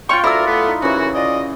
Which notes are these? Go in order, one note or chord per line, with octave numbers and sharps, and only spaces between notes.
C#4 F4 F5 G5 C6 C#6
D2 D3 E4 A#4 D5 E6
A3 B3
D#4
C2 F#2 C#3 E3 F#4
F4 D5 D#5